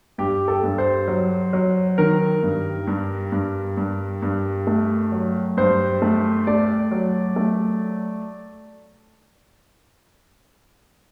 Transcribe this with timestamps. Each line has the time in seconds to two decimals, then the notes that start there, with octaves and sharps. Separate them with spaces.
0.18 G2 G4
0.48 A4
0.63 G2
0.78 C5
1.08 F#3
1.53 F#3
1.98 D#3 A#4
2.43 G2
2.87 G2
3.32 G2
3.77 G2
4.22 G2
4.67 A3
5.12 F#3
5.57 G2 C5
6.02 A3
6.47 A3 D5
6.91 F#3
7.36 A3